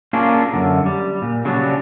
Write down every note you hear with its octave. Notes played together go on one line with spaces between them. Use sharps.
A#3 C#4 D4 F4 G#4
F#2 D3
G3
A#2
C#3 F#3 G3 D4